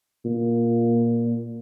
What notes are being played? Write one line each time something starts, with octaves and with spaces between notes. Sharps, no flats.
A#2